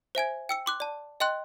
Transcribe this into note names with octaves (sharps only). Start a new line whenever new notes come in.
C5 E5 G#5 G#6
G5 E6 C#7
C6 D6 F#6
D5 A5
D#5 G5 C6 F#6